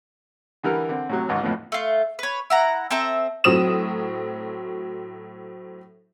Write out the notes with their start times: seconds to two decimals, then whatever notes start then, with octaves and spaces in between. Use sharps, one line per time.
0.63 D3 E3 G3 A#4
0.89 D3 C4
1.09 A2 C3 F#3
1.29 G#1 C#2 G#2
1.43 F2 A2 F3 A3 B3
1.72 A3 F4
2.19 B4 C#5
2.50 E4 F#5 A#5
2.90 C4 A4 E5 A#5
3.44 A2 F#3 C4 D#6 E7